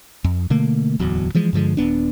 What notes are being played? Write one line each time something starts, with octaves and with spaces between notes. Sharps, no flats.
F2
B2 D3 A3 A#3
D1 E2 F#3
E3 F3 G#3
G2 D3 F3 G#3
D#1 B3 D4